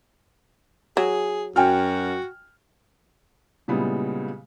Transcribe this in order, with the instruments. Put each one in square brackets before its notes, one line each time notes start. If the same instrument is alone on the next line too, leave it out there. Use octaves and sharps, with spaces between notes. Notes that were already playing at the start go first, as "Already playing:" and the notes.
[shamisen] F#3 [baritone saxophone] G#4
[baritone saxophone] F#2 [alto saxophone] F#4 [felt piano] G5 G#5 F6
[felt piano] A#2 C#3 G3 G#3 B3 E4